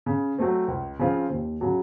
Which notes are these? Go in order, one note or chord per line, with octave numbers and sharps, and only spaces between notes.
C#3
F#3 A3 C4
C#2
C#3 F3 C4 F4
D#2
C#3 F#3